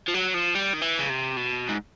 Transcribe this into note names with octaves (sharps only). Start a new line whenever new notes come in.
F3
F#3
F3
G3
D#3
E3
C#3
C3
B2
G#2